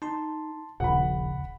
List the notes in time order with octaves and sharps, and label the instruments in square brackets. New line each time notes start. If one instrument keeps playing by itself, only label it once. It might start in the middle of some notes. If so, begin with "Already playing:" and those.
[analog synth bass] D#4 [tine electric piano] A5 C6
[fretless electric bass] D#1 [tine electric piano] A#1 [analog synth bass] C#3 [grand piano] F#5 B5